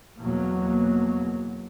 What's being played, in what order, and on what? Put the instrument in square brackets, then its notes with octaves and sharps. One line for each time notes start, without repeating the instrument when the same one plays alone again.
[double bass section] E2 B2 F#3 A#3